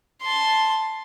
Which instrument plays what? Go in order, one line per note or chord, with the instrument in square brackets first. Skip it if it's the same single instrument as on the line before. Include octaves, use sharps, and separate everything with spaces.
[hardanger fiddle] A5 C6